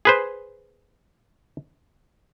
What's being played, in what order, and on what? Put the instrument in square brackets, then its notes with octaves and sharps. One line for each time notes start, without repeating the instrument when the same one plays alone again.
[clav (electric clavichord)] G#4 B4 C5